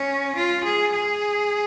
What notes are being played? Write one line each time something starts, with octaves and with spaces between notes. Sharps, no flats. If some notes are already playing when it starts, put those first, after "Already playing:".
Already playing: C#4
F4
G#4
G#4